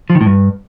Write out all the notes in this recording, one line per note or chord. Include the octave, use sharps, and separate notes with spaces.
F3
D#3
A2
G2